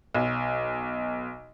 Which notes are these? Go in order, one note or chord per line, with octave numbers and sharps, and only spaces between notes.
B1